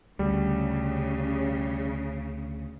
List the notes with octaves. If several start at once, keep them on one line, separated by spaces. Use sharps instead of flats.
D2 C#3 G3